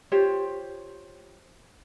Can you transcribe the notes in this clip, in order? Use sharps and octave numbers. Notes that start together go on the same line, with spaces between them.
F4 G4 C5 C#5